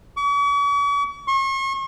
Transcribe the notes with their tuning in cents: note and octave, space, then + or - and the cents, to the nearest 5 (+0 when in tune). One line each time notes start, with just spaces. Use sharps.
C#6 +45
C#6 -40